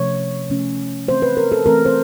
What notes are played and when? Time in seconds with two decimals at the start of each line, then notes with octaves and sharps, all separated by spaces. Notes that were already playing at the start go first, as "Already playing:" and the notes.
Already playing: C3 F3 A3 C#4 C#5
0.50 C3 F3 A3 C#4
1.08 E3 A3 C4 C5
1.22 B4
1.37 A#4
1.52 A4
1.66 E3 A3 C4 A#4
1.86 C5